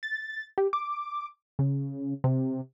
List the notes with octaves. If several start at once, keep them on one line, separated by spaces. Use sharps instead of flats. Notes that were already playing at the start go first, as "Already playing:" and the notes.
A6
G4
D6
C#3
C3